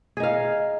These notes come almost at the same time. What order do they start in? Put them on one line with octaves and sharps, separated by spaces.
G#4 D#4 F5